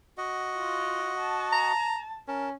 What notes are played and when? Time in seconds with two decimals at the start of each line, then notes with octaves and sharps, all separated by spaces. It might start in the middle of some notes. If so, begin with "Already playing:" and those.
0.18 F#4 D#5 F#5
0.56 F4
1.18 A5
1.53 A#5
2.28 C#4 A#4 A5